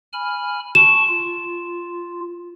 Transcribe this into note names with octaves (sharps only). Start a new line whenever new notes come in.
G#5 B5 F6
A5 C#6 E7
F4